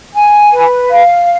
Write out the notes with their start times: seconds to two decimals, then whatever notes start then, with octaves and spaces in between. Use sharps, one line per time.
0.14 G#5
0.53 B4
0.91 F5